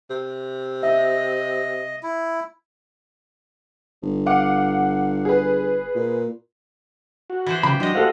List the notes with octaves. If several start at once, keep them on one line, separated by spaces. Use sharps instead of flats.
C3
D#5 E5
E4
G1
F5 F#5 D6
G#4 B4
A#2
F#4
E3 F3 C5
C#3 F3 G4 B5
F#3 G#3 D4 D#5
F#4 G4 A4 C5 F5 F#5